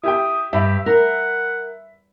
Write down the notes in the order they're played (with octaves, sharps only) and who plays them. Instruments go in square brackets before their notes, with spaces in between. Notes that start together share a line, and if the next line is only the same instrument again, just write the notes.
[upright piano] E4 G4 G5 [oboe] D#6
[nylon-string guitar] G2 [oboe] G4 [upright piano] E5 B5
[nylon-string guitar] A#4 [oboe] F#5